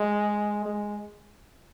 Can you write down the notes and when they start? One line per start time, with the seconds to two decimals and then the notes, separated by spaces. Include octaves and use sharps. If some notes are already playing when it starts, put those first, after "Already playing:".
Already playing: G#3
0.66 G#3